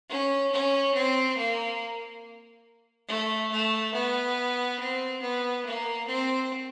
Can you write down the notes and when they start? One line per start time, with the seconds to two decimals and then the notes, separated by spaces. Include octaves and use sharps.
0.09 C#4
0.51 C#4
0.94 C4
1.37 A#3
3.08 A3
3.51 A3
3.94 B3
4.79 C4
5.22 B3
5.65 A#3
6.07 C4